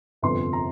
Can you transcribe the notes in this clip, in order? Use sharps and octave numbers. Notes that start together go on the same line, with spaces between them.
G1 F2 C3 F3 C4 C6
A#5